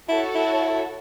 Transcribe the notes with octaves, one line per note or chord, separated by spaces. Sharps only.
E4 F#4 A4 C#5
E4